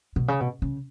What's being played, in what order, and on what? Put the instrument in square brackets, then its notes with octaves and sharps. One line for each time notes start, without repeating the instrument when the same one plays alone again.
[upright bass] B2
C#3
B2
C#3